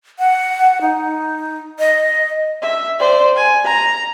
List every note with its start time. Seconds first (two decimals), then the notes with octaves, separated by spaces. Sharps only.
0.19 F#5
0.81 D#4
1.79 D#5
2.62 E5
2.99 C5 D5
3.36 G#5
3.65 A#5